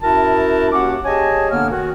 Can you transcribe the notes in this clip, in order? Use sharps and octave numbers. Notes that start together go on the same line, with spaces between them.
F#2 E4 F#4 A#4 A5
D#2 C#4 F#4 F#5 D6
G4 G#4 C#5 D#5 G#5 A5
D3 A#3 B3 D4 C#5 F6
D#3 F#4